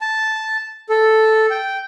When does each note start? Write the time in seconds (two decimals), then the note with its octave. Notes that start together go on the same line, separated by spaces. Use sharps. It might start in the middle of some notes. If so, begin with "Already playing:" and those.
0.01 A5
0.89 A4
1.50 G5